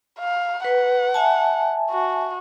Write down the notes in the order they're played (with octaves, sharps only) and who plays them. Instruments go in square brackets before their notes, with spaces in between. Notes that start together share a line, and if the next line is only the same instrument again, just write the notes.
[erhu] F5
[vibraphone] B4 [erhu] F#5
[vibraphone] E5 G#5 A5
[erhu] F#4